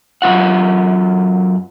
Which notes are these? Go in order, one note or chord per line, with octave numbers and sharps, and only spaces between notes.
F#2 E3 F4 F#5